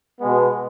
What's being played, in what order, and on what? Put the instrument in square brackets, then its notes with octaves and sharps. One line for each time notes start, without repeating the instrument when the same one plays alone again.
[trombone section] B2 G#3 B3